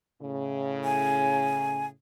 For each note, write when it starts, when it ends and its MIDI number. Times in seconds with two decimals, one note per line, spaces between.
0.21 1.89 45
0.21 1.89 49
0.84 1.86 80